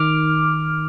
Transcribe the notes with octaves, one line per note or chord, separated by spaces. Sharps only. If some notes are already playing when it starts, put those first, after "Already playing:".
Already playing: D#3 D6 F6